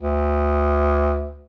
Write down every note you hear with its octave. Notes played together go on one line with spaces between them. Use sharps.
D2